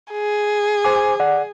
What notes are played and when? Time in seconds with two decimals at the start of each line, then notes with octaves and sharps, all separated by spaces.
0.12 G#4
0.84 C5 G#5 D6
1.20 D5 F#5